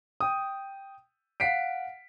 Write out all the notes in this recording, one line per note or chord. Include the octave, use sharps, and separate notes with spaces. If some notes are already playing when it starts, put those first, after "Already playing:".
G5 D#6
F5 F#5 B6 C7 D7